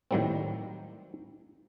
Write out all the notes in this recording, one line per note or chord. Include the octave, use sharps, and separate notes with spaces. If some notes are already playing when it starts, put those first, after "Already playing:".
A2 D#3 F#3 G3 A#3 C4